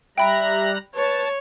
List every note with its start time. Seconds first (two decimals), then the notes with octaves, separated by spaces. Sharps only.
0.18 G3 E5 G5 A#5 B5 F#6 D7
0.95 B4 C#5 A5